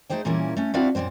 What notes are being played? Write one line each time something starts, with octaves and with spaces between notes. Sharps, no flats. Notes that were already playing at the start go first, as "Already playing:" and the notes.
A3 D#4 G#4 C5 G5
A#2 E3 G3 A#3 C#4 E4
A3 C#4
C4 D4 E4 F#4 D5 F5
F#2 A#2 E3 C4 C5